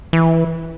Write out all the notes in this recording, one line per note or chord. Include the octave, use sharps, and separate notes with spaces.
E3